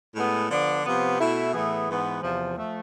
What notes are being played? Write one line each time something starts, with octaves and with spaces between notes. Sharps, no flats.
A2 G#3 B3
D3 F3 B3 D4
C3 F3 B3
B2 A3 E4
A2 E3 B3 E4 G#4
G#2 E3 B3
E2 C3 F3
F3 A3